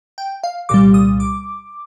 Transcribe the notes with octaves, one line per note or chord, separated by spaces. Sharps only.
G5
F5
C2 A#2 G3 D6
D#6
D6